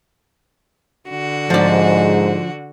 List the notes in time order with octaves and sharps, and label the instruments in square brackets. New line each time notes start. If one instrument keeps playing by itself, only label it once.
[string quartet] D3 F#4
[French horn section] G#2 [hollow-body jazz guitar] F3 D5